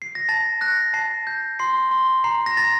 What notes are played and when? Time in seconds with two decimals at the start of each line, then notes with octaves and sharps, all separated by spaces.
0.02 C7
0.15 A#6
0.29 A5 A6
0.61 F#6 A#6
0.94 A5 C7
1.27 G6
1.59 C6 C7
1.91 C6
2.24 A#5 C7
2.46 A#6
2.57 A#5 A6